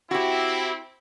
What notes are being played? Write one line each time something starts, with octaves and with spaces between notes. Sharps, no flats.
C4 E4 F#4 G4